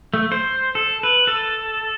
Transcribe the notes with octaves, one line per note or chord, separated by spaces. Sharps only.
A3
C5
A4
B4
A4